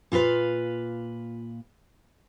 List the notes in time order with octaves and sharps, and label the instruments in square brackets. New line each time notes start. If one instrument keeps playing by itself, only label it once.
[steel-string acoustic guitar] A#2 F4 F#4 B4 F5